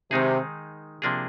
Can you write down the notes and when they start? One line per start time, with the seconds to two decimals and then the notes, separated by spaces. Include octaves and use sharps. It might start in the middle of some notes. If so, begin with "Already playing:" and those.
0.11 C3 D#3 G#3 D#4 G#4
1.02 C3 F3 A#3 D4 G#4